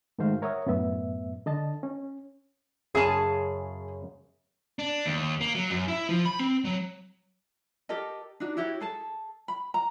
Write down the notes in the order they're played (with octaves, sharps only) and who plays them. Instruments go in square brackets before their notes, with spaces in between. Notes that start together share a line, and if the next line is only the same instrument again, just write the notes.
[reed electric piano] G#2 D#3 A3 F#4 C5 F5
A#4 C#5 E5 F#5 D#6
F#2 A2 B3 E5
D3 D#5 A5
C#4
[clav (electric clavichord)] F#2 C#3 [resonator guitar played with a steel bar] G#4 G#5 A5
[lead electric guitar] D4
D#2
A#3
F#3
F#2
E4
F3
B5
C4
F#3
[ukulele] G4 A4 A#4 D#5
D4 D#4 F#4
E4 F#4 G4 C#5
G#4 A4 A5
B5
A#5